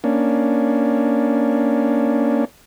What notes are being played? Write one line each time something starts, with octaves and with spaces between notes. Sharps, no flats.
A#3 C#4 D4